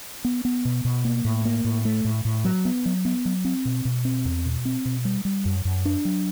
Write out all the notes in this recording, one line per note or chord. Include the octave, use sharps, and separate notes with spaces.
B3
B3
B2
B2
A#3
A2
A#3
A2
A3
A2
A2
F#3
B3
F#3
B3
F#3
C4
B2
B2
C4
E2
B2
C4
B2
G3
G3
F#2
F#2
D4
F#3